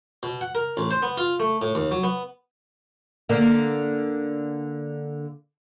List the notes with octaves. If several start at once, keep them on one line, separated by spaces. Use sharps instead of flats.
B2
F#5
A#4
A1
C5
B3
F4
A3
A2
D#2
F#3
B3
D3 A#3